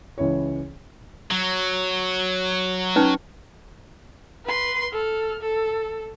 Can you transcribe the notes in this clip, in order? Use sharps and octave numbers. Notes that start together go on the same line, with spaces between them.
C#2 E3 C#5
F#3
C#4 D#4 B4
B4 C6
A4 F6
A4